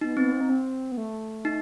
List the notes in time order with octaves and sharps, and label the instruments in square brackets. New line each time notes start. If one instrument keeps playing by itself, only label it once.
[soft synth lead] B3 [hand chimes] D#4
[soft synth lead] B3 [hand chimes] C4
[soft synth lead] C4
D#4
C4
B3
A3
[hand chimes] D#4